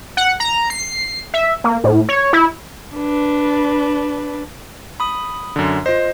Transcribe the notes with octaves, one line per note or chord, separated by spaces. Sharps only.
F#5
A#5
C7
E5
A#3
A2
C#5
E4
D4 B4
B5 D#6
F#2 D3
F4 C5 D#5